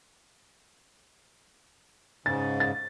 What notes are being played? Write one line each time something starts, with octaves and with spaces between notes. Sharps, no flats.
G#2 C#3 A6
A6